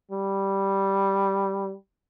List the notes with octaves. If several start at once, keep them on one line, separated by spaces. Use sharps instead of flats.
G3